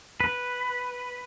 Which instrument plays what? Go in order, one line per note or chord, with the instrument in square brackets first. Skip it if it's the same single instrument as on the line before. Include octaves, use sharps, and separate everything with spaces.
[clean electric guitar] B4